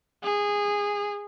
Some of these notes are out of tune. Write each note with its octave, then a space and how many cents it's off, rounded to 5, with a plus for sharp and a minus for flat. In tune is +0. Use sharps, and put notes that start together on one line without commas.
G#4 -15